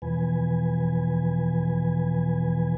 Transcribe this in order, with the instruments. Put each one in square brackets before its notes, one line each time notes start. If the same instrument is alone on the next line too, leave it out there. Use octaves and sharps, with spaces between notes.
[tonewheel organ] E2 B2 E3 F3 B4 G#5